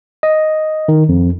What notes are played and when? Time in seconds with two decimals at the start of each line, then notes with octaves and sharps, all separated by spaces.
0.23 D#5
0.88 D#3
1.09 F2